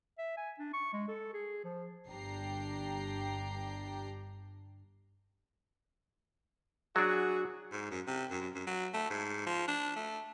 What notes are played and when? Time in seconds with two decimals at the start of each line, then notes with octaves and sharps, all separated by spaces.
0.18 E5
0.37 G#5
0.59 D4
0.73 C#6
0.93 G#3
1.08 A4
1.33 G#4
1.64 F3
2.09 G1 D4 G4 G5 A#5 C7
6.96 F#3 D4 F#4 G#4
7.72 G#2
7.91 F#2
8.07 C3
8.31 F#2
8.55 F#2
8.67 F#3
8.93 A3
9.10 G#2
9.46 F3
9.68 D4
9.96 A3